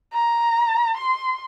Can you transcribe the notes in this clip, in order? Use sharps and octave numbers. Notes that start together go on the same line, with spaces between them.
A#5
C6